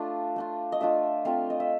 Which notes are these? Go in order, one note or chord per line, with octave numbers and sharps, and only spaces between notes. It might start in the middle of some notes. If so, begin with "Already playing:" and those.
Already playing: A3 D4 F4
A3 D4 F4
D#5
A3 D4 F4 E5
A3 C4 F4 F5
D#5
E5